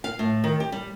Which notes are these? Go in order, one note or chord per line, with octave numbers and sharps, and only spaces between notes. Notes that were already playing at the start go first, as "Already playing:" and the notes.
F5
A2
D#3
G4
G3